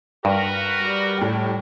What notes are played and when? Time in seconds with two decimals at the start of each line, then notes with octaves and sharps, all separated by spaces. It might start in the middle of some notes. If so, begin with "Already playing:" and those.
0.25 G2 F#4 A#4 B4
0.80 G3
1.18 A2 G5